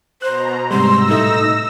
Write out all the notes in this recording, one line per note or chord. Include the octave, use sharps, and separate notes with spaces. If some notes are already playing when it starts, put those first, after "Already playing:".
B2 C5 A#5 F#6
G#2 C3 G3 C6 E6 A#6
A2 A3 D#4 E5